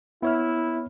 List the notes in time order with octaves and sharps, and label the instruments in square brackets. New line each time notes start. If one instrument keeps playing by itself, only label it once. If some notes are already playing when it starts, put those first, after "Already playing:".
[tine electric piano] B3 C#5 F6 [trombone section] E4